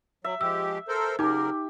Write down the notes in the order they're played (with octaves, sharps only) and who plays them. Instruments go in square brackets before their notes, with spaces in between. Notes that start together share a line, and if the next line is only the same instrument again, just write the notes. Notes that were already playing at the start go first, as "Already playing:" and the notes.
[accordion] F#3 [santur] E5
[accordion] F3 G#3 G4 [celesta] E6
[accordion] A4 A#4 C5
[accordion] C#3 F#3 A#4 [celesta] D#4 D6 [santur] G4